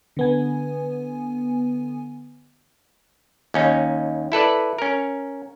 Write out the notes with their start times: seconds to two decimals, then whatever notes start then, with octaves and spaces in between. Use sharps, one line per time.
0.17 D3 B3 G#5
3.54 D#2 C#4 D#4
4.32 E4 A4 B4 D5
4.79 C#4 A#4